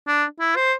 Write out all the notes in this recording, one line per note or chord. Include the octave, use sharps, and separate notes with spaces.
D4
E4
C5